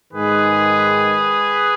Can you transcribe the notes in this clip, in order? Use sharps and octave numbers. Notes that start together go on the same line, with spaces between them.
G#2 D#3 G#3 G#4 B4